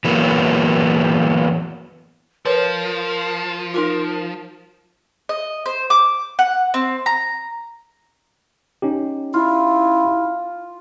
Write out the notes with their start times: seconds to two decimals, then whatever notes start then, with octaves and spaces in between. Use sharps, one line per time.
0.05 E3 F#3 A#3 B3
2.45 F3 A#4 B4 C#5
3.74 D#4 F4 A#4
5.29 D#5
5.66 C5
5.90 D6
6.39 F#5
6.74 C4
7.06 A#5
8.82 C#4 D#4 G4
9.34 E4 F4